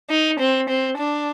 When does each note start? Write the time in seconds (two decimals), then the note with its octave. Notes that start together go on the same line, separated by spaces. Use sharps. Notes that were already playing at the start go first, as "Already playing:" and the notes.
0.10 D#4
0.39 C4
0.69 C4
0.98 D4